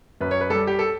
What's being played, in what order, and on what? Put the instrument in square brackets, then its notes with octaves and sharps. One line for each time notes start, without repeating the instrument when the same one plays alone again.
[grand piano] F#2 B4
C#5
B4
G3 A4
G4
A4